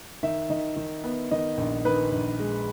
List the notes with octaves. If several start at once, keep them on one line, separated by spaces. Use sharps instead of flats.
D#3 E5
D#3 D#5
D#3
B3
D#3 D#5
A#1
D#3 B4
A#1
G#3